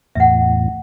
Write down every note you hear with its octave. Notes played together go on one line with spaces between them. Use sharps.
E2 A2 E5 F#5